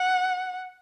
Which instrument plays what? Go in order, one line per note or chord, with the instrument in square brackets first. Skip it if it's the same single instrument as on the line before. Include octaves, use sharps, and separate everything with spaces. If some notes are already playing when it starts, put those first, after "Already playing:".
Already playing: [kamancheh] F#5